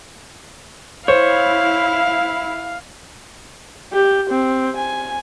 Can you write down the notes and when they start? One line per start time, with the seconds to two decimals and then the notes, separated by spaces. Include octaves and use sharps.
1.08 E4 C5 C#5 F5
3.93 G4
4.30 C4
4.77 G#5